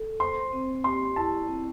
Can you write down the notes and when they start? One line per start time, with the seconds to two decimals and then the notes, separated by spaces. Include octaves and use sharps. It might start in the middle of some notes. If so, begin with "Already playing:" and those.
Already playing: A4
0.20 C5 C6
0.53 C4
0.84 G4 C6
1.16 E4 A5
1.48 C4